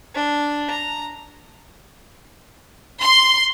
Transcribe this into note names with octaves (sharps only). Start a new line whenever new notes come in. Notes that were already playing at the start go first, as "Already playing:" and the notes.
D4
A#5
C6